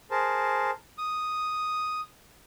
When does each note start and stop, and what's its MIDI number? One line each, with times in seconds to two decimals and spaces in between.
0.11 0.71 68
0.11 0.71 70
0.11 0.71 72
0.11 0.71 81
0.98 2.01 87